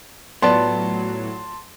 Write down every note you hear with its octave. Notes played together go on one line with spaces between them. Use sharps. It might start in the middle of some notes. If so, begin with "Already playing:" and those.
A2 F#3 B3 F4 D5 A5 C6